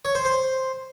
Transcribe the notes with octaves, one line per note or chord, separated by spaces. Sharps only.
C#5
C5
C5